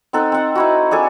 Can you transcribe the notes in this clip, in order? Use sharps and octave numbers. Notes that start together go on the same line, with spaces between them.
C4 D#4 A4 F#5
C4 F#5
D#4 E4 F#4
D4 G#4 A4 G#5